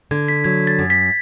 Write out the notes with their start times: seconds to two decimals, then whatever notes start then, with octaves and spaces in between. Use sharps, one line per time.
0.11 D3 G#6
0.28 B6
0.44 F#3 G#6
0.67 A6
0.79 F#2
0.90 B6